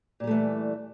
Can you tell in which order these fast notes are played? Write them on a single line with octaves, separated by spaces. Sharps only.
A#2 G3 A3 E3